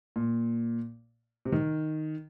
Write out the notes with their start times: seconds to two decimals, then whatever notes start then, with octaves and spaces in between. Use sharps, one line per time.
0.16 A#2
1.45 C3
1.52 D#3